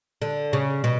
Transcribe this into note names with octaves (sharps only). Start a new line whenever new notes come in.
D3
C#3
B2